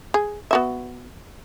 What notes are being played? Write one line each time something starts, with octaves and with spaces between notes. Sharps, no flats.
G#4
B3 F#4 E5